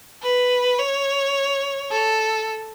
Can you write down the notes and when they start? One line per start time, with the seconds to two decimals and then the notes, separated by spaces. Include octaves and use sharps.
0.23 B4
0.79 C#5
1.91 A4